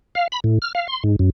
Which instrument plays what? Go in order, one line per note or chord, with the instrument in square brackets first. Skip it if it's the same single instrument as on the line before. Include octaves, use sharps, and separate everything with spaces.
[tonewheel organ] F5
B5
A2
F6
F5
C6
G#2
F#2